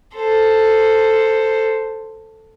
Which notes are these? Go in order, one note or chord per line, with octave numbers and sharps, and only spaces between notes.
A4 C5